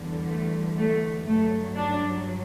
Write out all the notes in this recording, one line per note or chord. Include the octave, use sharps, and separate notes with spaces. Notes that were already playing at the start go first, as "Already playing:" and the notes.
Already playing: E2 D3 G3
A3
A3
G2 F#3 A3
D4